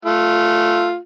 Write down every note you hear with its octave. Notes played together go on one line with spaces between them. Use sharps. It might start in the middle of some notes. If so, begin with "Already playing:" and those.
A3 F4